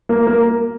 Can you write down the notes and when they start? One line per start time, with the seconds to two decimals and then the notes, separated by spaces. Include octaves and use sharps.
0.09 A#3
0.27 A#3